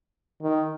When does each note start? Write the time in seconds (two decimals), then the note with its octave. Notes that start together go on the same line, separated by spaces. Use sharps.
0.42 D#3